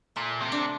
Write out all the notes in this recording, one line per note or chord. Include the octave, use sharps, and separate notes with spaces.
A#2 A3
C3
D4